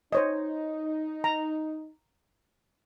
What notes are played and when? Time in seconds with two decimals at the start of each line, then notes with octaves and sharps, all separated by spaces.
0.12 D#4 C5 C#5 D#5
1.24 A#5